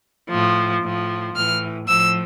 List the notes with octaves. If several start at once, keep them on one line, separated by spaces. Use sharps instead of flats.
A2 F3
A2 F3
A2 E3 F6
A2 F3 E6